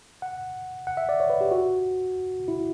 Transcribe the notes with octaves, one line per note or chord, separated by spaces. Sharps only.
F#5
F#5
E5
D5
C#5
B4
G4
F#4
E4